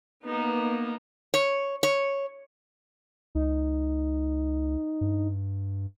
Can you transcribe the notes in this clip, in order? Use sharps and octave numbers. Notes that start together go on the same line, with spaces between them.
A#3 B3 D#4
C#5
C#5
C#2 D#4
G2